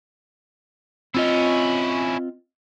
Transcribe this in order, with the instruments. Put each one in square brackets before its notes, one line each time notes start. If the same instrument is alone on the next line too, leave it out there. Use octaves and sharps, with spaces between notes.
[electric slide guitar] C4 F4 D#5 [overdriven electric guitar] C#4 E4